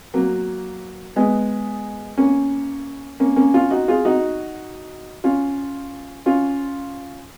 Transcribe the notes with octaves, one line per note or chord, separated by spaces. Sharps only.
F#3 A#3
G#3 B3
A#3 C#4
A#3 C#4
A#3 C#4
C#4 F4
D#4 F#4
F4 G#4
D#4 F#4
C#4 F4
C#4 F4